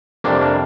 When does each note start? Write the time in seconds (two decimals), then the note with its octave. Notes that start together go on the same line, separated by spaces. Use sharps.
0.24 F2 C3 G3 A#3 D4
0.41 A#3 D4